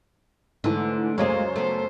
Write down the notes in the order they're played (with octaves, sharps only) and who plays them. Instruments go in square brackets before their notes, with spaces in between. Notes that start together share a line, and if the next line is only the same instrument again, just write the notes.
[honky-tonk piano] G#2 E3 [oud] D3 A3
[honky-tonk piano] C#2 F#2 C#5 [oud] G#3 A#3 G#4 [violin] C5
[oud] A3 B3 [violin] C5